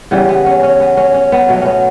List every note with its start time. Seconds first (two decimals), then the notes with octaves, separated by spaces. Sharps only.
0.11 C#3 E3 G3 B3
0.29 B3
0.46 C#4
0.63 C#4
0.80 B3
0.97 C#4
1.14 C#4
1.32 B3
1.49 B2 F#3 A3
1.62 B3 C#4